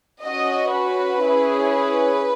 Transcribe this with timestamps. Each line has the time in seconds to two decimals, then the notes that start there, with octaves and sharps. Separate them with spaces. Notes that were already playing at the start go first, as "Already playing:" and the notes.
0.23 C#4 F#4 D#5
0.73 B4
1.21 C#4 E4 G#4
1.70 B4